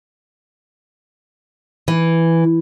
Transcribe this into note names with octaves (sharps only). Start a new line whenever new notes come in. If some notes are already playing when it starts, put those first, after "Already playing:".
E3